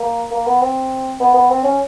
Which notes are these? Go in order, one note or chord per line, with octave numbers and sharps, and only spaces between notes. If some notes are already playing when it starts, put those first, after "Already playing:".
Already playing: A#3
A#3
B3
C4
B3
B3
C4
C#4